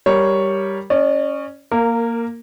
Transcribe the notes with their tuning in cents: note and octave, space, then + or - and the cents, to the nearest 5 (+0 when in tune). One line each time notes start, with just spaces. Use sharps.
G3 +0 A#4 +0 C#5 +0
C#4 +0 D5 +40
A#3 +0 A#4 -20